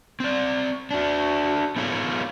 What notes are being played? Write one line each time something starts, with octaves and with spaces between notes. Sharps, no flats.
C4 D5
D4 F#4
B3 D#4 F4 G#4 C#5